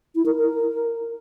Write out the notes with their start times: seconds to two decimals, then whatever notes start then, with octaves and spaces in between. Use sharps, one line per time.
0.15 E4
0.26 A#4
0.36 A#4